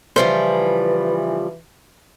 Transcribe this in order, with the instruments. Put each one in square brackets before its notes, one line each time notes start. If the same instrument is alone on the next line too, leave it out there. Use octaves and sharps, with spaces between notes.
[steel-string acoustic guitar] C#3 F3 G3 [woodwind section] E3 [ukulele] C5